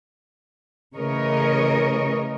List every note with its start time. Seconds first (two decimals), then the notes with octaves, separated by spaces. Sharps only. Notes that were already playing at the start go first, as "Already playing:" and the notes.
0.96 C#3 E3 A3 A#4 C#5 D#5